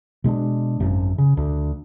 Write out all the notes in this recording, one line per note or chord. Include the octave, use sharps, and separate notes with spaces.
B2 G#3 C#4 D4
G#1 F#2
C#3
D2 D3